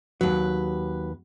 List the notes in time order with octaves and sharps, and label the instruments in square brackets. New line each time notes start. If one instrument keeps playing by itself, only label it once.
[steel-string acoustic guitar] D#2 B4 [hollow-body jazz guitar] F#3